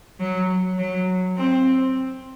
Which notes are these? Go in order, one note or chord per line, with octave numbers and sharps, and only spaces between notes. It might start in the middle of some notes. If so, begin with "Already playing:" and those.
F#3
F#3
C4